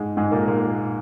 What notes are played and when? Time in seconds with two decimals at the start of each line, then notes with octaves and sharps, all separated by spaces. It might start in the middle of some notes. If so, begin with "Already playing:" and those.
Already playing: G#2 G#3
0.17 G#2 G#3
0.32 A#2 A#3
0.47 A#2 A#3